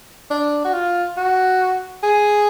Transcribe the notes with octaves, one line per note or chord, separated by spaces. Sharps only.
D4
F#4
F4
F#4
G#4